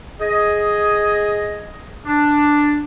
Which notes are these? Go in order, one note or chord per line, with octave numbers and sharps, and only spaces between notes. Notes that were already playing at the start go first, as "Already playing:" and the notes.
G#4 D#5
D4